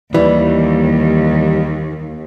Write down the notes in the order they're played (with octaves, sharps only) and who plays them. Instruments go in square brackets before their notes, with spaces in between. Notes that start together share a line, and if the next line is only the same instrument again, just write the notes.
[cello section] D#2 [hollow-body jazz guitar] E3 G3